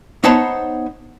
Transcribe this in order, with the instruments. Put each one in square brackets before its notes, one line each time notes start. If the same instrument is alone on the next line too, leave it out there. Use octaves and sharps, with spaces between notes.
[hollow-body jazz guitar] B3 D#4 C5 C#5 A5 B5